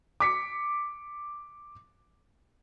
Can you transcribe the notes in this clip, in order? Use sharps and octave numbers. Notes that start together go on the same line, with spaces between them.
D6 B6 C#7